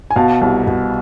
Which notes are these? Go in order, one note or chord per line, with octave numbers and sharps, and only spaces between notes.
G#5
B2 F5 A5
C2
B2